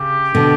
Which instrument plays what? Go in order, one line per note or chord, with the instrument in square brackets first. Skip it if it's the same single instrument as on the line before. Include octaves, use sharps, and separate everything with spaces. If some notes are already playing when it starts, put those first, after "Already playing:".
Already playing: [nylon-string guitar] C#3 [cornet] G4
[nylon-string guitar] B2 D3